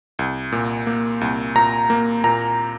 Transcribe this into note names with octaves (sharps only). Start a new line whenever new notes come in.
C2
A#2
A#3
C2
A#2 A#5
A#3
A#2 A#5